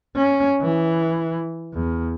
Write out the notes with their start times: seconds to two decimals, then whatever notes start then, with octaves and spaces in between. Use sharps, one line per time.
0.16 C#4
0.61 E3
1.73 E2